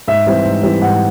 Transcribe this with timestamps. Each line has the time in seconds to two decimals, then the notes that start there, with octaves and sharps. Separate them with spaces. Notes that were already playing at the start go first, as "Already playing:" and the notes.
0.08 G#2 E5
0.26 E3 G3 C4
0.46 G#2
0.63 E3 G3 C4
0.82 G#2 F#5